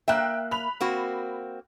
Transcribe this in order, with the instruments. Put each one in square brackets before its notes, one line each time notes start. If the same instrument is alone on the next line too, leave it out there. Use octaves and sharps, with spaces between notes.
[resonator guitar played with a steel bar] A#3 E5 [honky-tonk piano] G5 F#6
[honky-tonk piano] B5 F7
[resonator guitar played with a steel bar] A#3 C4 F#4